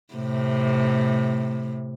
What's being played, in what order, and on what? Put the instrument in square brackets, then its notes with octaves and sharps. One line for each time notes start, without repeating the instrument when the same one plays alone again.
[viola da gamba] A2 C3